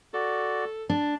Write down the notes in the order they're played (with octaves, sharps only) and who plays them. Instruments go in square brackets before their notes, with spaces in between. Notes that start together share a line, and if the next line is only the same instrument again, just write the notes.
[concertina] F#4 D5 [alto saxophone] A4
[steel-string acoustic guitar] D4 [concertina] A5